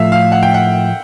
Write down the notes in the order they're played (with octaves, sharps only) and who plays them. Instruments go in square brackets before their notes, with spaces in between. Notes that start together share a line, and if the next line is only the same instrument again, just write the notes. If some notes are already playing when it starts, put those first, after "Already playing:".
Already playing: [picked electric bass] A2 F3 A3 [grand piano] E5 F5
[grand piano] F5
F#5
G5
F#5